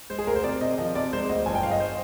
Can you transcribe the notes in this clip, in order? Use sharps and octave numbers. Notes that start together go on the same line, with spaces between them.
G#3 C5
G#4
D2 A#4
C5
C3 D5
C3 D#5
F3 D#5
C3 D5
G#3 C5
D2 D#5
G1 G#5
G5
G1 F5
D#5
C5